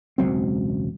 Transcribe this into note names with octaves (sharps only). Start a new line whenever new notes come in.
E1 C#2 F#3 C4